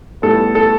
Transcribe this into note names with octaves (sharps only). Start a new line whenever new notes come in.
A2 G3 B3 A4
A4